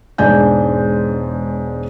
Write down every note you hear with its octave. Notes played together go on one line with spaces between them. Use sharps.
E1 G#2 G#3 D4 G#5 G6